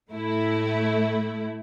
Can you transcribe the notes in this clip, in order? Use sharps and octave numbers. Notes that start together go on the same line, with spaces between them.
A2 A3 E4